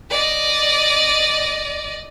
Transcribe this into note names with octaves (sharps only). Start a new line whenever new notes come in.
D5 D#5